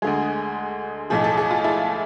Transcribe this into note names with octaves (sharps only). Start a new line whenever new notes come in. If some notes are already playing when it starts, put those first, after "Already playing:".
D2 D3 G#3 G#4
B1 A2 F3 G#4
A4
G#4
F4
E4